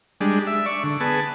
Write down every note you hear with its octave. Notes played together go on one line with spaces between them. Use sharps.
G3 G#3 D4
E5
D5 C#6
D3
B3 G#4 A5